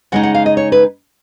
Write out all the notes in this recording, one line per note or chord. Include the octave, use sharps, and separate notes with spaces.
C#3 G#3 D#4 F#5
F#5
F5
D#5
C#5
B4